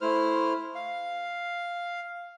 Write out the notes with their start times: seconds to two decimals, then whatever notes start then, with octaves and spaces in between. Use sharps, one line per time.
0.01 A3 E4 C5 F6
0.75 F5